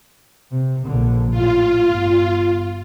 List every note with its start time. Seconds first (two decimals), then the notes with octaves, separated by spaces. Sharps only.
0.51 C3
0.86 A#1 D3
1.31 A2 F4
1.85 G1